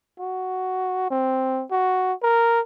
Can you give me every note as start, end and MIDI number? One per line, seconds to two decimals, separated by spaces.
0.19 1.08 66
1.10 1.64 60
1.71 2.13 66
2.23 2.60 70